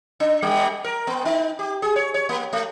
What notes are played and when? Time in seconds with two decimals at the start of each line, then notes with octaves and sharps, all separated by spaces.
0.20 D4
0.42 G3
0.84 A#4
1.07 B3
1.25 D#4
1.59 G4
1.82 G#4
1.96 C#5
2.14 C#5
2.29 A#3
2.53 A3